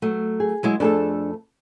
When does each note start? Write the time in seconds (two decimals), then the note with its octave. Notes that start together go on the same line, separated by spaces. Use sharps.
0.02 F#3 A3
0.40 G#4
0.63 F#3 G#3 E4
0.80 F2 A3 D4 G#4 A4 A5